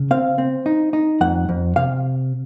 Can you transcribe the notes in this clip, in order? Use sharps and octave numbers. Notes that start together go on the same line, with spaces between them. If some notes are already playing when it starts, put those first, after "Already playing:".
Already playing: C#3
C4 F5
C4
D#4
D#4
F2 F#5
F2
C3 F5